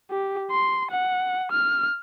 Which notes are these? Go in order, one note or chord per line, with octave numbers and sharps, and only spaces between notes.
G4
C6
F#5
F6